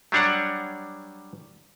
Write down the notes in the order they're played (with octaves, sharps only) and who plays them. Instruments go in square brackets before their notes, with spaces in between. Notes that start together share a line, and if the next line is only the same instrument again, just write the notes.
[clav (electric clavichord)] F#3 G3 D4 C#5 F#5